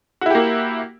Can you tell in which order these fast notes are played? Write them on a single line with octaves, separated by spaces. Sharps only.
F#4 E4 G4 A#3